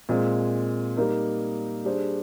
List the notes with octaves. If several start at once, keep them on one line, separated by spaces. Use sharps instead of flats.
A#2 G#3 C4
G3 A#3 D#4 A#4
G3 D4 G#4 C5